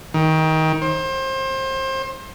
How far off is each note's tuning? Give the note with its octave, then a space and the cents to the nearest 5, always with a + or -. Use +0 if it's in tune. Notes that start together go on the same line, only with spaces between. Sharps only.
D#3 +25
C5 +25